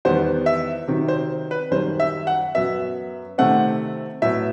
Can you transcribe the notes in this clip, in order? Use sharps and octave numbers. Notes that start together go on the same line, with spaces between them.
E2 D#3 G3 B3 C5
E5
C3 D#3 F#3
C5
B4
F#2 D#3 G3 C5
E5
F#5
F#2 F#3 B3 E5
C3 D#3 A3 C4 F#5
A2 F#3 B3 E5